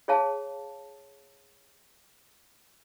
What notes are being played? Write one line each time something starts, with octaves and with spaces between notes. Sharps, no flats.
G#4 C#5 F5 A5